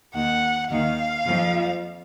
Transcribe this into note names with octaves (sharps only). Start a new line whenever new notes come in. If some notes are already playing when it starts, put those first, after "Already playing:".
D#2 D#3 F#5
D#2 D#3 F5
F2 F3